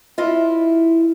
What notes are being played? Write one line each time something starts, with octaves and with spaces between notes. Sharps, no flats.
E4 F4 D#5